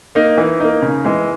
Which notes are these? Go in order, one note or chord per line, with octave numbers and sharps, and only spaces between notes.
A#3 D#4
E3
A#3 D#4
C#3
E3 G#3